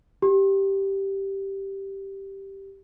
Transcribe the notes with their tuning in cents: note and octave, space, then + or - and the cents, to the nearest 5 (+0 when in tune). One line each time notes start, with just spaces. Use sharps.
G4 -5